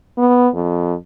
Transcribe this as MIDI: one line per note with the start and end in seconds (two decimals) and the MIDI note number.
0.18 0.48 59
0.54 0.94 41